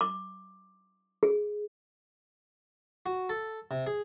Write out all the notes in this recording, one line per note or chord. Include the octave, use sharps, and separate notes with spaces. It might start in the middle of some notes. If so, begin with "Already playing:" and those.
D6
G#4
F#4
A4
C3
G#4